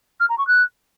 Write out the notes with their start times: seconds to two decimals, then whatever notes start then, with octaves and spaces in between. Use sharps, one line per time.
0.20 F6
0.29 A#5
0.38 C#6
0.47 F#6